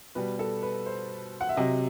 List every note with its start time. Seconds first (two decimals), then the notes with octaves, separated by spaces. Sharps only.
0.15 B2 G3 B4
0.39 A4
0.63 B4
0.86 C5
1.41 F#5
1.49 E5
1.57 C3 F#3 D#5